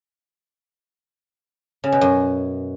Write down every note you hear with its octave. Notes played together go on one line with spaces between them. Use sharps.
C#3
B2
F#2